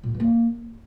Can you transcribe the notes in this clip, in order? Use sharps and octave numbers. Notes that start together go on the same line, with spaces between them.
A#2
D3
E3
A#3